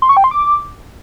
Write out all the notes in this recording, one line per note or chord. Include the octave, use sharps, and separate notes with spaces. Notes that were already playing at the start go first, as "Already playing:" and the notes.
C6
C#6
G5
C6
D6